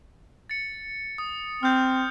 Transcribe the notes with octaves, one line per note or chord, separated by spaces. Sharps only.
A6 C#7
D#6
C4 F6 G6